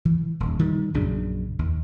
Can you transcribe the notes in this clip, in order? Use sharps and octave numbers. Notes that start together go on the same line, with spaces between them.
E3
D#1
D#3 G3
A#1 F#2 C#3 D4
D#2